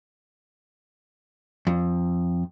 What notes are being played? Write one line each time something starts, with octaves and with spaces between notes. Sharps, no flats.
F2